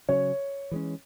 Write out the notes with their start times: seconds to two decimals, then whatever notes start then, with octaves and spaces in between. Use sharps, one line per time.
0.09 C#3 F#3 C#4 C#5
0.71 E3 G#3 C#4